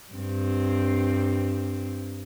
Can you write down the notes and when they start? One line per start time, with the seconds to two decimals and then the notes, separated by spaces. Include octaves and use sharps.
0.12 G2 C4